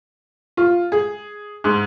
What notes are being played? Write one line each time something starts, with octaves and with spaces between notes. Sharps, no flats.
F4
G#4
G#2